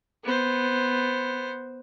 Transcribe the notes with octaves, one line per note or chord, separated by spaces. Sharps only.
B3 C5